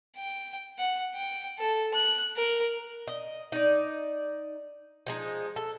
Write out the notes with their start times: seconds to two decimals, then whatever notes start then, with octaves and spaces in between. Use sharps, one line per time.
0.17 G5
0.79 F#5
1.15 G5
1.58 A4
1.94 F#6
2.37 A#4
3.08 D#5
3.52 D#4 D5
5.07 F3 G#3 D#4
5.56 A4